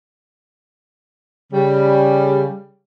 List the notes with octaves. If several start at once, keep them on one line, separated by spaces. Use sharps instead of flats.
C#3 G3